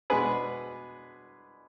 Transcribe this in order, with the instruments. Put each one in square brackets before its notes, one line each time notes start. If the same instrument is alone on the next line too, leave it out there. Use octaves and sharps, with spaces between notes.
[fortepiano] B2 G#3 B3 D4 G#4 B4